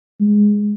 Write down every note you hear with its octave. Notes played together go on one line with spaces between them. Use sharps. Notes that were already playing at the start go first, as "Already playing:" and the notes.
G#3